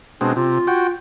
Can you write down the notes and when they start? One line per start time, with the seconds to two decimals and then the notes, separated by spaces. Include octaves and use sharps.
0.21 B2 G#3 C4 D4
0.36 C3 F4
0.67 F#4 G5